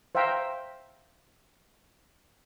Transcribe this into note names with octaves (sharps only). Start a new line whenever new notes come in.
C5 E5 F5 G5 A#5